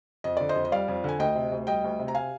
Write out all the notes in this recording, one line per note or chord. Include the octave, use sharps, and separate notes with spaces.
F2 D#5
D3 D5
C5 D#5
F2
D#5
G3 D5 F5
F2
D3 G#5
D2 D#5 G5
C3
D2
G3 D#5 G5
D2
C3
A#5
F5 G#5